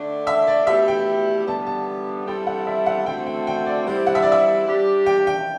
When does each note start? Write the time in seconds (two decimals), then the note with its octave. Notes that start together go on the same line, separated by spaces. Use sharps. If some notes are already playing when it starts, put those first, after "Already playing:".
Already playing: D3 A3 D4
0.27 E5
0.47 D5
0.67 B2 A3 E4 G4 E5
0.88 G5
1.47 D3 G3 B3 A5
1.67 A5
2.27 G3 C4 E4 A4 G5
2.47 F#5
2.67 E5
2.86 F#5
3.06 D3 A3 C4 F#4 A4 G5
3.26 G5
3.47 G5
3.66 D5
3.87 G3 C4 E4 G4 C5
4.07 F#5
4.15 E5
4.22 D5
4.32 E5
4.66 G3 D4 G4
5.06 G5
5.27 G5